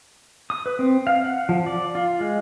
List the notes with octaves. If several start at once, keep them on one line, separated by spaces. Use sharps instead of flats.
D#6
B4
C4
F5
F#5
F3
D5
F4
G#3